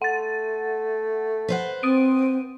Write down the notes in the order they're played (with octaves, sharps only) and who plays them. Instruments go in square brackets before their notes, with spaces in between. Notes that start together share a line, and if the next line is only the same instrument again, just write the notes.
[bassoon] A3 [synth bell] F#5 A6
[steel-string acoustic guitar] B4 C5 F#5
[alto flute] C4 [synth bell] D#6 D7 D#7